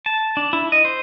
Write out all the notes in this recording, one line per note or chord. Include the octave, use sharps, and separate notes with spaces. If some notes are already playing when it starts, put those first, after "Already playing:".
A5
D4
E4
D#5
C5